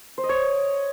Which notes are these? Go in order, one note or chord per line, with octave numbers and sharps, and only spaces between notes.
C5
D#5
C#5